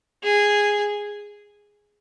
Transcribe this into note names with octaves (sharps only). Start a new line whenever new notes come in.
G#4